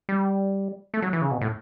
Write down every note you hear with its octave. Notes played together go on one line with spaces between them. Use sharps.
G3
A3
F#3
E3
C#3
B2
A2